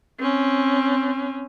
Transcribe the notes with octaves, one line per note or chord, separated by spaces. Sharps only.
C4 C#4